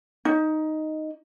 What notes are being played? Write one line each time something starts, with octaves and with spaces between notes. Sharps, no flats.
D#4